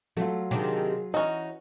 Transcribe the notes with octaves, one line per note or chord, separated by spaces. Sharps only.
F#3 A3 F4
C3 D#3 D4 G#4
E3 C#4 D#4 F#4